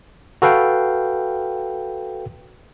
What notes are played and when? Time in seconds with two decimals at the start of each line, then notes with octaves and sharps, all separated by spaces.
0.42 F#4 A4 B4 F5 G5